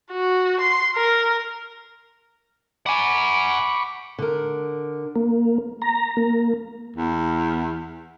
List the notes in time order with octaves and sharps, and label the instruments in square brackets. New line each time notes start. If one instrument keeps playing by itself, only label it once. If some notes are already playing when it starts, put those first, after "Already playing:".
[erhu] F#4
C6
A#4
[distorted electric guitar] F#5 G#5 [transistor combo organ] B5 C#6 D6
[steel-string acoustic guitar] D3 A#4
[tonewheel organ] A#3
A#5
A#3
[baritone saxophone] E2